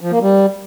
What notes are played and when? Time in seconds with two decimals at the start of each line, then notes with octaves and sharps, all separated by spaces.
0.01 F3
0.11 A#3
0.22 G3